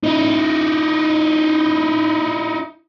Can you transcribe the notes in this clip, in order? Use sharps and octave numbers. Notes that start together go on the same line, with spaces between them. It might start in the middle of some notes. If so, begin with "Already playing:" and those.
D#4 E4